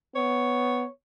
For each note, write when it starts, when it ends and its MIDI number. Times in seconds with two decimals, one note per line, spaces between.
0.16 0.85 59
0.16 0.89 73